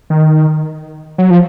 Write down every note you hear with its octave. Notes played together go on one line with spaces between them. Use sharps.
D#3
F#3
F3